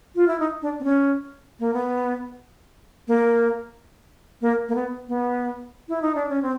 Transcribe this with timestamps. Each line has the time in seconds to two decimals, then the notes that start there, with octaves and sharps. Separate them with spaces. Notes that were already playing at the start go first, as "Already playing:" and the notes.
0.16 F4
0.28 E4
0.40 D#4
0.62 D4
0.80 C4
0.84 C#4
1.60 A#3
1.74 B3
3.08 A#3
4.41 A#3
4.69 A#3
4.75 B3
5.08 B3
5.88 E4
6.02 D#4
6.15 D4
6.29 C#4
6.43 C4